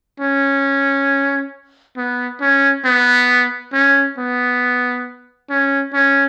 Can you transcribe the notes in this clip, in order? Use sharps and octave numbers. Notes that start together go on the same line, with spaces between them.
C#4
B3
C#4
B3
C#4
B3
C#4
C#4